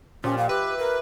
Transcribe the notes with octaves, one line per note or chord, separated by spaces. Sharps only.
A#2 F3 C#4 G4 D#5
F5 A#5
G4 B4 E5
A#4